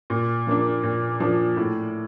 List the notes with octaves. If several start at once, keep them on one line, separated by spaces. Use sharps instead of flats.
A#2
F3 A#3 D4
A#2
F3 A#3 D4
A2